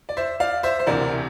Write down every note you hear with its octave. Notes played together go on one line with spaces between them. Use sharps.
D5
C5 E5
D5 F5
C5 E5
C5
E1 D2 C3 E3 A#4 D5